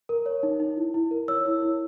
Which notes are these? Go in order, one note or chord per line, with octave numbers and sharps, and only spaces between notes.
A#4
C#5
D#4
D#4
E4
E4
A#4
C#5 E6
E4
E4